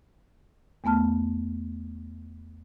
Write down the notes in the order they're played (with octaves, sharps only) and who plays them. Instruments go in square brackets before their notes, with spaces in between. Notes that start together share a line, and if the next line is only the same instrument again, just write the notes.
[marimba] E2 A3 B3 A5 F6